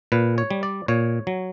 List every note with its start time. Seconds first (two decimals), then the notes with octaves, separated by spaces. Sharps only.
0.12 A#2 B4
0.38 C#5
0.51 G3
0.63 D5
0.88 A#2 C#5
1.27 F#3